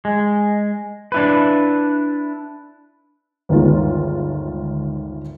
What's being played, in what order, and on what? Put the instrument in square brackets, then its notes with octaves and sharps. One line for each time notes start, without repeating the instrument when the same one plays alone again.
[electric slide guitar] G#3
D4 E4 B4
[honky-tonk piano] G1 D2 D#3 G#3 F4